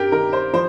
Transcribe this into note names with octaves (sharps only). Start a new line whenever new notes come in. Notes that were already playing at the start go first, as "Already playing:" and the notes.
Already playing: G2 G4 A#4
D#3 A#4
C5
F3 C5